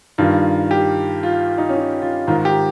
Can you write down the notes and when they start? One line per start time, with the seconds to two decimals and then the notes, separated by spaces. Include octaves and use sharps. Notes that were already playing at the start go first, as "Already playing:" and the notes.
0.18 G2 D#3 F4
0.71 G4
1.23 F4
1.58 D#4
1.69 C#4
1.75 D#4
2.02 F4
2.27 G#2 D#3 F4
2.45 G4